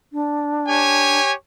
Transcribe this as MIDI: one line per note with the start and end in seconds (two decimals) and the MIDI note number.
0.12 1.18 62
0.68 1.32 67
0.68 1.32 73
0.68 1.32 80